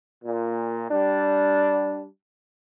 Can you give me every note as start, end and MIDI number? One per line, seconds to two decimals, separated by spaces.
0.25 0.88 46
0.91 2.05 55
0.91 2.05 62